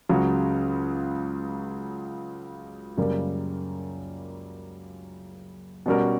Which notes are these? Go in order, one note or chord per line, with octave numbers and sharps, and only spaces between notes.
C#2 C#3 F#3
F#2 C#3 G3 A#3
B2 G3 C#4 F#4 A#4